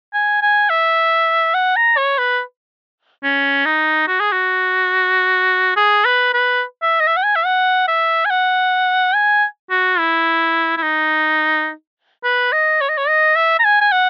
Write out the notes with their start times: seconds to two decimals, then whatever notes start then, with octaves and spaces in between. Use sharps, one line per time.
0.14 G#5
0.42 G#5
0.70 E5
1.54 F#5
1.76 A#5
1.97 C#5
2.18 B4
3.23 C#4
3.65 D#4
4.08 F#4
4.20 G#4
4.32 F#4
5.76 G#4
6.05 B4
6.34 B4
6.82 E5
7.00 D#5
7.07 E5
7.17 F#5
7.24 G#5
7.36 E5
7.45 F#5
7.88 E5
8.25 G#5
8.31 F#5
9.15 G#5
9.70 F#4
9.99 E4
10.77 E4
10.83 D#4
12.24 B4
12.53 D#5
12.81 C#5
12.89 D#5
12.97 C#5
13.08 D#5
13.36 E5
13.59 A#5
13.64 G#5
13.81 G#5
13.92 F#5